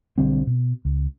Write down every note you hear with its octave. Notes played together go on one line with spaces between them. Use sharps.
B1 D3 G3 C4
B2
C#2